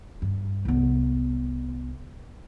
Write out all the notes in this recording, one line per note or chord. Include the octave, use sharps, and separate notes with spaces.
G2
C2 B3